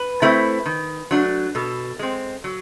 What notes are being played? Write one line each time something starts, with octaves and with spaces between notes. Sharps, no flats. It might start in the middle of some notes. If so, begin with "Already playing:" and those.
Already playing: B4
A3 C4 E4
D#3
F#3 A3 D4
B2 A4
G#3 C4
F#3